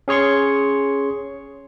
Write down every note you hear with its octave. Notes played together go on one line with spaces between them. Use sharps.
C#4 G#4 C#5 C6 C#6